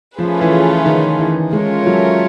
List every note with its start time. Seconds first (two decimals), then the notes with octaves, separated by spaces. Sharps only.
0.18 F3 A3 C#4 F4 G#4 B4
0.41 E3
0.86 D#3
1.19 E3
1.53 G#3 A3 C#4 F4 A#4 C#5
1.86 F#3